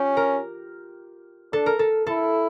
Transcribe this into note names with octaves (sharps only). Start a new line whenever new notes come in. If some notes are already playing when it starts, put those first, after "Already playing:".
Already playing: C#4 F4 G4
A#4
D4 A4
A#4
A4
E4 A4